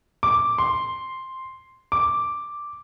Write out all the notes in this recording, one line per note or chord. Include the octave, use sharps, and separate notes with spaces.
D6
C6
D6